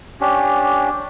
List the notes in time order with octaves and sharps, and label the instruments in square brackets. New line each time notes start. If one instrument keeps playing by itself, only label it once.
[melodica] C#4 D4 G4